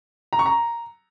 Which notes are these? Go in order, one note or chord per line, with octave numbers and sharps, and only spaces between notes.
A#5
C#6
A#5